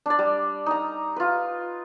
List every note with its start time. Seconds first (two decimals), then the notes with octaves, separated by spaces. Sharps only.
0.06 D4 D5
0.19 G3
0.66 D#4 A#5
1.16 F4 B4